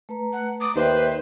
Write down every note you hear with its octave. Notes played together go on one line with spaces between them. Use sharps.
A3 B4 A#5
F#5
D6 D#6
D#2 B4 C5 D5 E5 G5